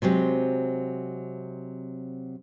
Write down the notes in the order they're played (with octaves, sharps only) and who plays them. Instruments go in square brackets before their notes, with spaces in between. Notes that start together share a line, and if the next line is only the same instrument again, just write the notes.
[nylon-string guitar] C3 F#3 G#3 C4